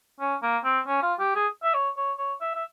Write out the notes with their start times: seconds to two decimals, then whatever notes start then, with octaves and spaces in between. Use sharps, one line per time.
0.20 C#4
0.42 A#3
0.64 C4
0.87 C#4
1.02 F4
1.19 G4
1.35 G#4
1.63 E5
1.74 C#5
1.97 C#5
2.18 C#5
2.41 E5
2.55 E5